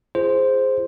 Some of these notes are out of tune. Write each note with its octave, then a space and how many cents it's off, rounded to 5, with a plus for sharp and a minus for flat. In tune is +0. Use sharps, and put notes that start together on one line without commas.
F4 -35 G#4 +0 C5 +0